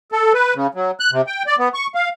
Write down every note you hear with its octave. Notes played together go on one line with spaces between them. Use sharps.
A4
B4
C#3
F#3
F#6
C3
G5
D5
B3
C#6
F5